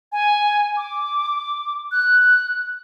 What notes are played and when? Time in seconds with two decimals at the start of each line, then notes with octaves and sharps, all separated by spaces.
0.12 G#5
0.77 D6
1.92 F#6